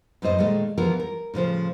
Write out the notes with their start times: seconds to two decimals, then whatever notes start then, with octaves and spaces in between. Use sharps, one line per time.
0.22 F#2 A2 D#4 C5 D#5
0.39 A#2 D#3 G#3 A3
0.77 E2 E3 F3 B3 A#4
1.00 A#4
1.34 A2 C#3 F3 C5